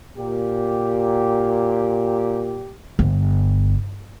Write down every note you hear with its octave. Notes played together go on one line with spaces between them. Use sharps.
A#2 G4
G1